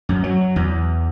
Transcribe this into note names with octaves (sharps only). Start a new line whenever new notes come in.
F#2
F#3
E2